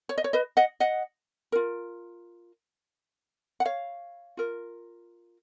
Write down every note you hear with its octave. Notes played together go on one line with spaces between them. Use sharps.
C#5
D#5
C#5
B4 D#5
D#5 F#5
D#5 F#5
F4 A#4
F#5
C#5 F5
F4 A#4